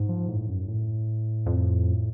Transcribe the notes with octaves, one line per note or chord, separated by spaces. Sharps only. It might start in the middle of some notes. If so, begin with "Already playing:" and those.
Already playing: G#2
F3
A2
F#2
A2
F2